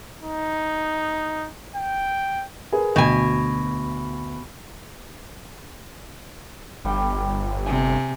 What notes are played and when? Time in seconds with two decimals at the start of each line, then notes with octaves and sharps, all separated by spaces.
0.23 D#4
1.76 G5
2.72 G#4 A#4 B4
2.96 D2 B2 G#5
6.85 G1 G3 G5
7.66 C3 G#5